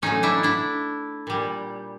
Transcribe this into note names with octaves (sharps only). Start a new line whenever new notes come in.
D3 F#3 A3 C#4 D#4
D4 E4
D4 E4
A#2 G3